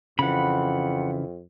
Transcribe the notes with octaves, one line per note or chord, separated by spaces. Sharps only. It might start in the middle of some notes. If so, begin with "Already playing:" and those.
F2 C#3 E3 F#5 B5